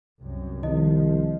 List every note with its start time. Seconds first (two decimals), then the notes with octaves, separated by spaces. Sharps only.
0.20 C2 F#2
0.63 C2 D#3 F3 D#5